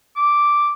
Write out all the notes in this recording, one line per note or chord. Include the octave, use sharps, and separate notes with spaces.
D6